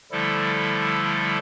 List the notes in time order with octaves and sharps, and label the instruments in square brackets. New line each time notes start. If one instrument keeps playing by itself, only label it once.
[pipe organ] D3 F3 G3 A3 E4 A4